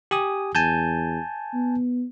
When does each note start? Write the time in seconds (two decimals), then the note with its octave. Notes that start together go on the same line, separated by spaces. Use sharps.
0.11 G4 G#5 D#6
0.55 E2 G#5 A5 G6
1.54 B3